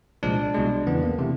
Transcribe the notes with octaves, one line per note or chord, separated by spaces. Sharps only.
C2 A#2 F3 G#3 D4
C2 B2 G#3
E2 C#3 E3 B3
A#3
C3 E3 A3